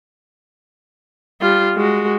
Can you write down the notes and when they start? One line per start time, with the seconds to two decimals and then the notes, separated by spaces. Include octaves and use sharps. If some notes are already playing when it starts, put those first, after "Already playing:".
1.41 G3 F4
1.76 G#3 F#4